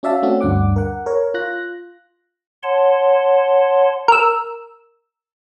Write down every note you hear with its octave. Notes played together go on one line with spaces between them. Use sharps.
C#4 F#4 D5 E5 F5 A5
A3 C4 C#4 F#4
D2 G2 D4 F#5 D6
A#4 F#5
A#4 C#5
F4 F#6 A#6
C#5 F#5 A5 C6
A#4 E6